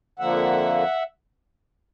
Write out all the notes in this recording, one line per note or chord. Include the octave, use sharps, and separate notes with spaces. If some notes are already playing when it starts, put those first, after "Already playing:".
F2 D3 F3 A#3 E5 F#5